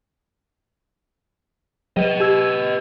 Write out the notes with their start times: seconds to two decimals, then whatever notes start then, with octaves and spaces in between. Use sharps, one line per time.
1.97 F#3 B4 D#5
2.20 G4 E6 G#6